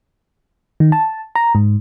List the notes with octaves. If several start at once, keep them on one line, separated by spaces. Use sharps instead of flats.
D#3
A5
A#5
G#2